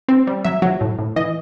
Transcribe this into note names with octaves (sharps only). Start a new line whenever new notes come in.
C4
G3
F#3 E5
F#3
A2
A2
E3 D#5